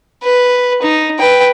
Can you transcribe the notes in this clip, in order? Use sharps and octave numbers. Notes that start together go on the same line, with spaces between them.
B4
D#4
B4 G5